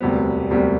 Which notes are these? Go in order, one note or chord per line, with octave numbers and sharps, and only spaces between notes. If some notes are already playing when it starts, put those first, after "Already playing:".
E1 D2 C3 G3 B3
E1 D2 C3 G3 B3